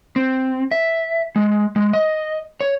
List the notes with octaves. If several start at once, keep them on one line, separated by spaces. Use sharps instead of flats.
C4
E5
G#3
G#3
D#5
C#5